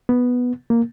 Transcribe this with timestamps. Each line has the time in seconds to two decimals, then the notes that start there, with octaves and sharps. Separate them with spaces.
0.09 B3
0.70 A#3